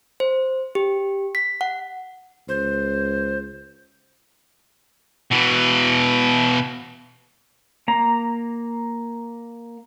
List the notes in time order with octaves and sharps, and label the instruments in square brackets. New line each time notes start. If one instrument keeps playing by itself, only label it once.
[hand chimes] C5
G4
B6
F#5
[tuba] C#2 [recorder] C5
[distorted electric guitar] B2 E3
[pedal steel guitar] A#3 A#5